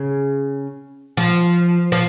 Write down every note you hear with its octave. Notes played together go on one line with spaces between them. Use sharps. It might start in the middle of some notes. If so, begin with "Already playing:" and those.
Already playing: C#3
F3
F3